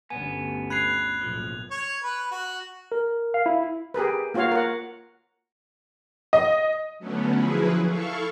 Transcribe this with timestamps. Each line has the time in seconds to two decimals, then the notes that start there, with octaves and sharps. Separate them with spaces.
0.10 G1 D2 B3 C#4 G#5
0.70 B5 F#6 G#6 C7 F7
1.21 F#1 B1 A2 F3
1.71 C#5
2.04 B4
2.32 F#4
2.92 A#4
3.34 F5
3.46 E4
3.94 G4 G#4 A#4 B4
4.34 A#3 F4 F#4 C#5 F5
4.52 A#4 F#5
6.33 D#5
6.99 D3 F#3 A3 B3 C#4
7.33 F3 F#3 E4 G#4 B4
7.87 E4 A4 F5 C#6